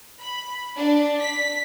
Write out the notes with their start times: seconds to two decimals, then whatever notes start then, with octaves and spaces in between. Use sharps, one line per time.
0.20 B5
0.77 D4
1.20 B6